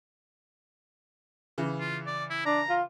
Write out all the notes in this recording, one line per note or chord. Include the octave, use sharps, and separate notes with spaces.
C#3 E3
F4
D5
E4
D4 A#5
F4